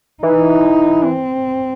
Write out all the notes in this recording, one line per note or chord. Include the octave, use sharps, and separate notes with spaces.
E3 D#4
C4